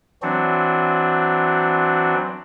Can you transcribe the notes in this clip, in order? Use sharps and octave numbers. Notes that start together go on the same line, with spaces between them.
E3 F#3 C4 D4 F#4